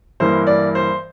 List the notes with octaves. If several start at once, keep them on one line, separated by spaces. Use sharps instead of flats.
G2 E3 A#3 C5
D5
C5